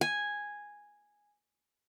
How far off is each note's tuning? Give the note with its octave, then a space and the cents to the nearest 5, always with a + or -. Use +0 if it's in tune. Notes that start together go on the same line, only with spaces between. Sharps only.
G#5 -5